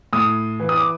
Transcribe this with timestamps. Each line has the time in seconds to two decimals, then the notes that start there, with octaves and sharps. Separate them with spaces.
0.13 A2 D#6
0.60 E3
0.69 D#6
0.77 D6